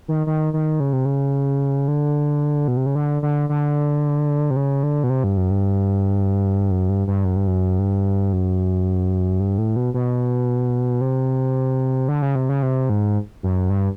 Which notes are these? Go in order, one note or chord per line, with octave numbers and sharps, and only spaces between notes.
D#3
D#3
D#3
C#3
C3
C#3
D3
B2
C3
C#3
D3
D3
D3
C3
C#3
D3
B2
C3
G2
F#2
G2
F#2
G2
G2
F#2
G2
F#2
G2
F#2
G2
A2
B2
B2
C3
D3
C#3
C3
C#3
C3
G#2
F#2
G2